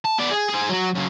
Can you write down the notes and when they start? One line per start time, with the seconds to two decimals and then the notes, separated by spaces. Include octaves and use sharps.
0.05 A5
0.19 B3 D5
0.31 G#4
0.50 G#4 C5
0.69 F#3 F#4
0.94 F#2 C#3